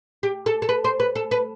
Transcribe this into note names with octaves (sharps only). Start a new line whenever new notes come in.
G4
A4
A4
B4
C5
B4
A4
B4